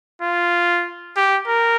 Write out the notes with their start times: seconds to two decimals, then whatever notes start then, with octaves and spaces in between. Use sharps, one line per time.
0.22 F4
1.16 G4
1.48 A#4